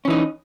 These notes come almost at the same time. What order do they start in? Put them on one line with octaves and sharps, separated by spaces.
C#4 E3 D#4